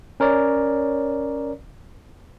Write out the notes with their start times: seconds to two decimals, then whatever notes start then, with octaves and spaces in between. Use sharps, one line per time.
0.20 C#4 A#4 C#5 D5